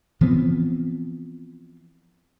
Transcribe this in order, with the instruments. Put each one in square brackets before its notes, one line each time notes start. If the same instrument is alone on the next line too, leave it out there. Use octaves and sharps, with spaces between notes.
[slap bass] E3 F3 B3 C4